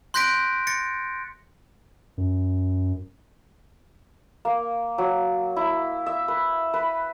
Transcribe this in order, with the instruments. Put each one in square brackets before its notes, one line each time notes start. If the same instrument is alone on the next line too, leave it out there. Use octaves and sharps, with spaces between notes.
[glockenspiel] C6 F#6 G6 A#6 B6 D7
A6 A#6 C#7
[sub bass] F#2
[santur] A#3
F#3
E4
E5
B4
B4